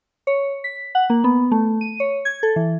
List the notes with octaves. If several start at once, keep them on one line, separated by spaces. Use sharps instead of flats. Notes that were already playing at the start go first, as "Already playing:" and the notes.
C#5
B6
F#5
A#3
B3
A3
D#7
C#5
G#6
A4
E3